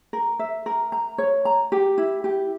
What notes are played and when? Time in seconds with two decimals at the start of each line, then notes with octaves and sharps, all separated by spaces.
0.13 A#4
0.39 E5
0.66 A#4
0.92 A#5
1.18 C#5
1.45 A#5
1.72 G4
1.98 E4
2.24 G4